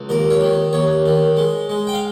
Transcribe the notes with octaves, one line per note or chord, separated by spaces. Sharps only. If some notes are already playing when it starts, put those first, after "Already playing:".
Already playing: C#2
D#2 A#4
C#5
D#3
D#2 C#5
D#3
G#3
G#3
G5
F5